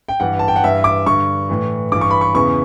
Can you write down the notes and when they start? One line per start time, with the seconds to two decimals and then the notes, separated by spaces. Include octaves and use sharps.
0.09 G5
0.20 G2 E3 F#5
0.39 A5
0.48 G5
0.56 F#5
0.64 G2 E3 E5
0.84 D6
1.06 G2 D3 C#6
1.49 A2 E3
1.92 G2 E3 D6
2.01 C#6
2.11 B5
2.21 C#6
2.35 E2 C#3 E3 C#6